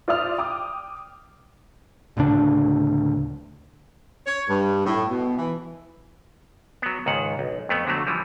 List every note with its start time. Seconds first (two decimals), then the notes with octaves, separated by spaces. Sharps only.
0.08 F4 C5 D5 E5 D#6 F6
0.38 G5 D6 D#6
2.17 D1 D2 C#3 D4
4.27 C#5
4.49 G2
4.86 A2
5.09 B2
5.38 E3
6.82 F#3 B3
7.06 C#2 G#2 D#3 F#5
7.39 B1
7.69 F2 A3 B3
7.87 D3 F#3 A3
8.07 E3 F3 G3